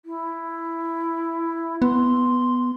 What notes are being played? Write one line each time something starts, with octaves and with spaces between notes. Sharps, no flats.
E4
B3 C6